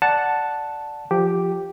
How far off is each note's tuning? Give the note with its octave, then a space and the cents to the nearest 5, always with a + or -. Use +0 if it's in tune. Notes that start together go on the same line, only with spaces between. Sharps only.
D5 +0 F#5 +0 A5 +0
F3 +0 G4 +0